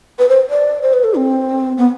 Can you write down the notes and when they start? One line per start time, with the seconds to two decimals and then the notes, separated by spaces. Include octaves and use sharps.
0.19 B4
0.29 C5
0.50 D5
0.82 C5
0.93 B4
1.04 A4
1.15 C4
1.78 B3